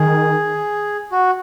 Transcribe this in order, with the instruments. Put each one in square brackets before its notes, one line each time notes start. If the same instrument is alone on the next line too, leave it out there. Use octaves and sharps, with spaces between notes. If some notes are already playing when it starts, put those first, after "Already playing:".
Already playing: [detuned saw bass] D#3 [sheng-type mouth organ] G#4
[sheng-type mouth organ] F#4